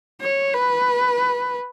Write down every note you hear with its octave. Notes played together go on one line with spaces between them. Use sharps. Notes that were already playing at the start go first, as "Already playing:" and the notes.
C#5
B4